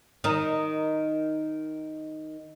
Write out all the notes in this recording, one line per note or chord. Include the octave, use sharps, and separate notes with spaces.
D#3 D#4